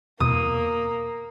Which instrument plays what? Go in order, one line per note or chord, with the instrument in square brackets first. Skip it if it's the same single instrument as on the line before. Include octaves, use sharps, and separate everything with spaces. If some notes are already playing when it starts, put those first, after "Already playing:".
[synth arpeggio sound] E2 B2 [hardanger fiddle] A#3 [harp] D#6